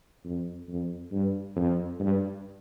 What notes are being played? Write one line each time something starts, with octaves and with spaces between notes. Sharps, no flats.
F2
F2
G2
F2
G2